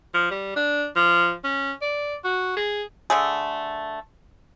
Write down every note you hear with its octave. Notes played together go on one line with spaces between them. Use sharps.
F3
G3
D4
F3
C#4
D5
F#4
G#4
D3 A3 G#4